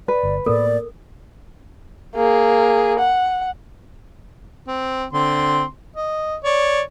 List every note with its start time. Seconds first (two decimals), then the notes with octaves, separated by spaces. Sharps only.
0.08 B4 D5
0.23 G1
0.46 A2 A#3 B3 A4 A#4 D5
2.15 A#3 G#4
2.99 F#5
4.68 C4
5.13 D3 C4 C6
5.96 D#5
6.45 C#5 D5